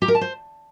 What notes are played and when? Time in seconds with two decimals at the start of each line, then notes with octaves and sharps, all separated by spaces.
0.02 G4
0.08 A#4
0.15 A5
0.21 C5